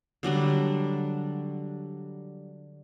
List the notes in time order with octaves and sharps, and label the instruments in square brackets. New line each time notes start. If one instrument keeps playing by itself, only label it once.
[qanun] D3 F#3 G3 D4